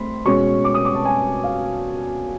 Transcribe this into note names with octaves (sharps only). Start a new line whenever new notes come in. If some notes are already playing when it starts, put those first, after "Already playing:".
Already playing: A3 C4 B5 C6
B2 G#3 C#4 C#6
D6
D#6
D6
A5
G#5
F5